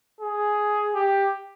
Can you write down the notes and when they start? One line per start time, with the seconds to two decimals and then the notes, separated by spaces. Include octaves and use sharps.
0.21 G#4
0.95 G4